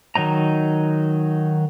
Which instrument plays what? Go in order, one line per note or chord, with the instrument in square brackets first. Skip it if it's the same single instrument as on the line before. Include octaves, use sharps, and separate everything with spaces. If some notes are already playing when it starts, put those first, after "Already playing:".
[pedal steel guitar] D#3 F#3 D#4 A#5